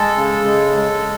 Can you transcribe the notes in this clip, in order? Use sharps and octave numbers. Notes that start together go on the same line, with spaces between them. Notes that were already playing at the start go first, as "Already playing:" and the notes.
Already playing: G#3 A4
C#3
G#3
G#3